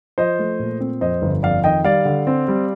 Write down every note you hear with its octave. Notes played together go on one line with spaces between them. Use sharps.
F3 C5 D#5
A3
A#2
C4
F2 C5 D#5
G1
F2 D5 F5
D#3 D#5 G5
G3 D5 F5
D3
C4
G3